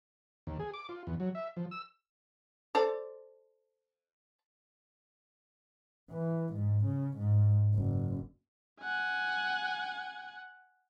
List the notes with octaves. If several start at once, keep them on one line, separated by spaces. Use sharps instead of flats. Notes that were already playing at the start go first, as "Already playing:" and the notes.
D#2
G#4
D6
F4
E2
F#3
E5
F3
E6
A4 C5 D5
E3
G#2
C#3
G#2
F#1
F#5 G#5